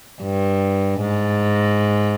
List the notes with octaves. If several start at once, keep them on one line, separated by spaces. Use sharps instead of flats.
G2
G#2